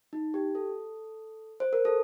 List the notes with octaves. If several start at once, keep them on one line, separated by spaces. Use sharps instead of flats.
D#4
G4
A4
C5
A#4
A4